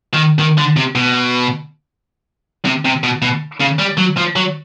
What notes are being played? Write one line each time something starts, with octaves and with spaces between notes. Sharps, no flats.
D#3
D#3
D3
C3
B2
C3
C3
B2
B2
C#3
G3
F#3
F3
F#3